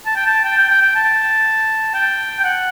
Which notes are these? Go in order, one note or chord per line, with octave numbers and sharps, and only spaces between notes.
A5
G5
A5
G5
G5
G5
G5
A5
G5
G5
F#5